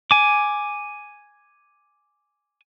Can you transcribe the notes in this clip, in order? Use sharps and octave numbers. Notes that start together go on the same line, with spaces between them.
G#5 D6